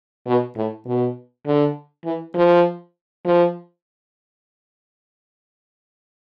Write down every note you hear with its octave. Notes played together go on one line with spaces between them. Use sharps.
B2
A2
B2
D3
E3
F3
F3